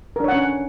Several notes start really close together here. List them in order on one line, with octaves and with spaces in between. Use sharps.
A#4 D4 C#5 F#5 C#4